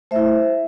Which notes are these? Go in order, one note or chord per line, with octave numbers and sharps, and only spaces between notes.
A3 E4 C5 E5